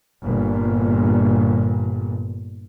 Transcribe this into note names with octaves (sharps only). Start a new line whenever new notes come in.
G1 A#2